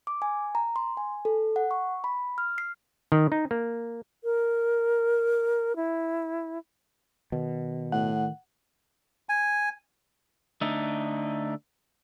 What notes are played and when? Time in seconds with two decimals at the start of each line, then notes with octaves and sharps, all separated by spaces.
0.07 D6
0.22 G#5
0.55 A#5
0.76 C6
0.97 G#5
1.25 A4
1.56 F#5
1.71 C#6
2.04 B5
2.38 F6
2.58 C7
3.12 D#3
3.32 D#4
3.51 A#3
4.24 A#4
5.76 E4
7.32 B2 D#3
7.92 A2 F#5
9.29 G#5
10.61 D3 A3 D#4